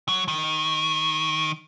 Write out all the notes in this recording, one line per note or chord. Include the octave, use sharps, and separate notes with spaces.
F#3
D#3